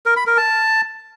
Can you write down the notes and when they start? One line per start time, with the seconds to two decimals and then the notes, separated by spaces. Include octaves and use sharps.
0.06 A#4
0.16 B5
0.27 A#4
0.38 A5